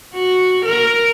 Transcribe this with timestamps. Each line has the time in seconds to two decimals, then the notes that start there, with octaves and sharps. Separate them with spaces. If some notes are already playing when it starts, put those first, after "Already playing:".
0.14 F#4
0.66 A#4